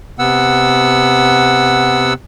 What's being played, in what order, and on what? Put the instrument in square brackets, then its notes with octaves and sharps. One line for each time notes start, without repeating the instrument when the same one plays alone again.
[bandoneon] C3 B3 F#5 E6